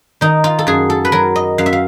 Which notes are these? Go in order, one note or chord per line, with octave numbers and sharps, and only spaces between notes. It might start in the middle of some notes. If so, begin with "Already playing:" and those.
D#3 D#4
F4
A4
F#2 G#4
A4
B4
F#3 A#4
D#5
F#2 F5
E5
F5